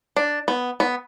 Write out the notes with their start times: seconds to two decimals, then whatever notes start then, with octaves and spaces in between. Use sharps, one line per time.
0.16 D4
0.48 B3
0.80 B3